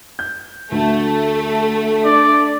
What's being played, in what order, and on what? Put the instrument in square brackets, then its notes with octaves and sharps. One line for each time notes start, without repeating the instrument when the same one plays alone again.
[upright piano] G6
[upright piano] D2 [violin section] A3
[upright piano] D4 [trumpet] D5